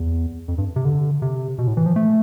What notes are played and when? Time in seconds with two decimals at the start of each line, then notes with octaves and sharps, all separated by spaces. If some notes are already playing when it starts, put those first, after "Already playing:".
Already playing: E2
0.48 F2
0.58 G2
0.76 C3
0.85 D3
1.22 C3
1.59 B2
1.67 A2
1.77 E3
1.86 F3
1.96 A3